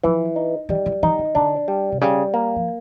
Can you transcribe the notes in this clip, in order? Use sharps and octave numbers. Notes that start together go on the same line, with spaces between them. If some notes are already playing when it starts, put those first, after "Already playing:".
E3 F3
D#4
E3 G3
E3
E3 D#4
D#3
D3 D4
G3
C3
C#3 G3
A#3
F3